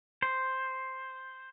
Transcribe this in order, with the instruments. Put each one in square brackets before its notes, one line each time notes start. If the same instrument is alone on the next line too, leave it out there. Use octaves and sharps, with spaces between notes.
[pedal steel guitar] C5